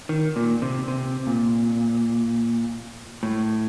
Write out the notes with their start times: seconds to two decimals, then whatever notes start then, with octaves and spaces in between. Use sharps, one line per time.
0.09 D#3
0.36 A#2
0.62 C3
0.88 C3
1.27 A#2
3.23 A2